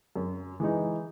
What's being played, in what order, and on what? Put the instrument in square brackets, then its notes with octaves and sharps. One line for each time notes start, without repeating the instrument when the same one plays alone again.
[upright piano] F#2
E3 G#3 D#4